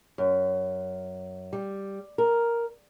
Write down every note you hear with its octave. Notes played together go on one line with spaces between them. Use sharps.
F#2
G3
A#4